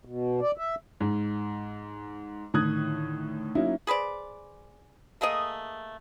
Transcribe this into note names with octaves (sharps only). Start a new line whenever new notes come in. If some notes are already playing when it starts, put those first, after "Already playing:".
B2
D5
E5
G#2
A2 D3 D#3 D#6 F#6 G#6
F#3 A#3 C#4 D#4 E4
G#4 B4 C5 D5
A3 A#3 G#4 D#5